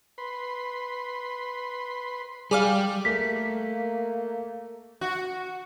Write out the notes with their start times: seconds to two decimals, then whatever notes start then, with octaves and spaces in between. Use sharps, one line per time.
0.18 B4 B5 C6
2.51 G3 G#4 D5 F5
3.05 A3 A#3 B6
5.01 F#4